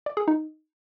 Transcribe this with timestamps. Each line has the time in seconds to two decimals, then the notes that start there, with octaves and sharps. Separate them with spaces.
0.06 D5
0.17 G#4
0.28 D#4